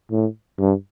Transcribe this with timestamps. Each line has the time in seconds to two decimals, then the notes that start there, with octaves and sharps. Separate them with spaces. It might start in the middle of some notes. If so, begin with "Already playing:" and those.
0.12 A2
0.59 G2